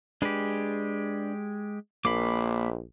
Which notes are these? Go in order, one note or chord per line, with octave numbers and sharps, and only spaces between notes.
G#3 D4 G4 G#4 B4
A#1 A#3 B5 D6